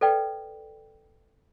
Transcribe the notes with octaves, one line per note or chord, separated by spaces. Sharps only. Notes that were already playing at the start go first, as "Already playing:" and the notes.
A4 B4 D5 G5